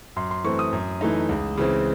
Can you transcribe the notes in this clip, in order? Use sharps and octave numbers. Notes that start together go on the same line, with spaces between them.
F#2 C6
C6
E3 A3 C4 C#6
D#6
F#2
E3 A3 D#4
C#2
C#3 E3 C4